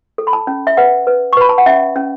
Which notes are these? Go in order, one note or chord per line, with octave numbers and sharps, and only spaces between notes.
A4
B5
A5
C#4
E5
B4 F#5
B4
C#6
B4 B5
A5
F#5
C#4 E5
C#4